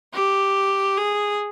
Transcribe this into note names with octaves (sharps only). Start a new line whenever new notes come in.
G4
G#4